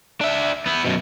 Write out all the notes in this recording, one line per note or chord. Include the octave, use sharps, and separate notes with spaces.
D4 E5
B3 E4
F#2 B2